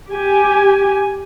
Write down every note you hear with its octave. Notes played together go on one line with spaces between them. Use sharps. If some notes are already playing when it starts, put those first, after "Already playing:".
G4 G#5